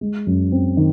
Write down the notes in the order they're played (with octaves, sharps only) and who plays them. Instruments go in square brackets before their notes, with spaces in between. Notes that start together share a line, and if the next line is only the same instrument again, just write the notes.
[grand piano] G#3
F#2
C4
D#3